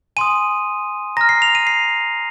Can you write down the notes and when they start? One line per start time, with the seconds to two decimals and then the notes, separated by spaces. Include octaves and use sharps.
0.17 G#5 C6 D#6 D#7
1.17 A#5 F6 A#6
1.29 C7
1.42 F7
1.55 D#7
1.67 C7